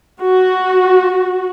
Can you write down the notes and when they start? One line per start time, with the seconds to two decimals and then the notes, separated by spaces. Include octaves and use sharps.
0.21 F#4